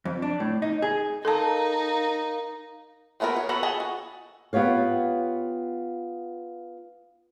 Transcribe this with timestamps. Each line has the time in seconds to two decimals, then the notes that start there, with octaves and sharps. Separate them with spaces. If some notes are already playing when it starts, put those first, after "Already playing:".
0.05 F2
0.22 D4
0.40 A2
0.62 D#4
0.82 G#4
1.25 D#4 A4 A#4 F5 A5 A#5
3.20 G#3 A3 B3 F4 A#4
3.36 C#5
3.49 B3 F#4 A4 A#5 B5
3.63 G#4 D#5 A5
3.80 F#4
4.53 B3 F4 G4 C#5 F5